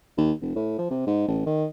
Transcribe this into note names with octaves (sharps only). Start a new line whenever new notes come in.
D#2
F1
A2
F3
C3
G#2
A1
D#3